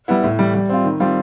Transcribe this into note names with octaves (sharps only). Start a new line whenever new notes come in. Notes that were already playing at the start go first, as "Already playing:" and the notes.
G3 B3 E4
A2
E3 G3
G3
C4 F4
D#3
G3 C4 F4